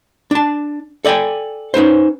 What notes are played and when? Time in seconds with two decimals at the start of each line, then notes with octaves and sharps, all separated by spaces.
0.31 D4 A5
1.05 A4 D5 D#5 G5 G#5
1.74 C#4 D#4 B4 C5